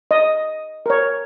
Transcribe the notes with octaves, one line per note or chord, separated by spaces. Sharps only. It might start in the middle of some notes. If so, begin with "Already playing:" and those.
D#5
A#4 C#5